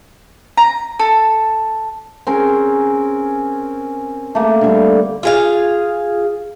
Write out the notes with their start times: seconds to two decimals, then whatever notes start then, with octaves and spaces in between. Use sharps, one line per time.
0.57 A#5
0.99 A4
2.27 C4 C#4 G#4 A#4
4.35 A3 A#3
4.61 D3 G3
5.23 F4 G#4 F5